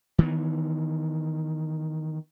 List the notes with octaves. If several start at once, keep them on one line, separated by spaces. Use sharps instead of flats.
D#3 E3 B3